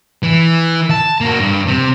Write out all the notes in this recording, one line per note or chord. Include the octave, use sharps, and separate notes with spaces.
E3
A5
A#3 F#4
G2
C3